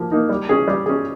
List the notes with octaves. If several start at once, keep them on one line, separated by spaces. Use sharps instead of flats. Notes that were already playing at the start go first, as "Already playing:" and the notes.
Already playing: F3 A#3
A#3 D#4
G3
C#4 G#4
G3
C#4 G#4